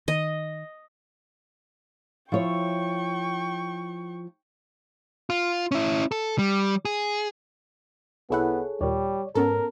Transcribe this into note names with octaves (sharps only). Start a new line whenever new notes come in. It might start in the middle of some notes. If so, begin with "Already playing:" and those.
D#3 D#5
F3 E4 C#5 G5 C#6
F4
C#4 E4
A4
G3
G#4
C2 B3 E4 G#4 A4 C#5 F#5
D#2 A#2 G3 C#5 D5
G#2 B3 C#4 A4 A#4